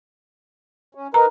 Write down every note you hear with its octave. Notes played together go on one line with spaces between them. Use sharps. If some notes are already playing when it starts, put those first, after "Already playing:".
C#4
D#4 A#4 B4 A#5